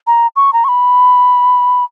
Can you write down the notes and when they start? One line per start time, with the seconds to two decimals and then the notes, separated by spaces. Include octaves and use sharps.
0.07 A#5
0.36 C#6
0.53 A#5
0.64 C#6
0.68 B5